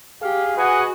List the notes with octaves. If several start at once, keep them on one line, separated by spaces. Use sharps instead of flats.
G4 G#4 F5
F#4 B4 D#5 F#5 G#5